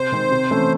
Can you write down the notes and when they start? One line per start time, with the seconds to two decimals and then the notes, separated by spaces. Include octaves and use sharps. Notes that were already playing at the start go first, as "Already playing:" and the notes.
Already playing: C3 C5
0.12 D#3 G#3 C4
0.31 C3
0.50 E3 A3 C#4